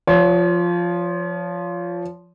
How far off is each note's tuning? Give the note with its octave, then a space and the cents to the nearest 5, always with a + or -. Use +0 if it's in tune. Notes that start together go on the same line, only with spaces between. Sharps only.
F3 +0 C#5 +35